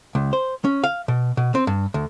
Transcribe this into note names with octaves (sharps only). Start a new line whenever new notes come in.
C#2
C5
C#4
F5
B2
B2
C4
G2
D2